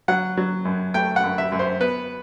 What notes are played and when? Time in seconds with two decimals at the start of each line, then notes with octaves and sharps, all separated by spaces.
0.08 F#3 F#5
0.37 F#3
0.65 F#2
0.94 A3 G5
1.16 F#5
1.24 F#2
1.38 E5
1.52 F#2
1.59 C5
1.80 B3 B4